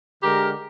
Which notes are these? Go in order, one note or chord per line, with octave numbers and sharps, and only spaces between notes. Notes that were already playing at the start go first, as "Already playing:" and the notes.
D3 G#3 G4 A#4